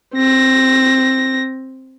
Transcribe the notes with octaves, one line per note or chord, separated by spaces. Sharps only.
C4 A#6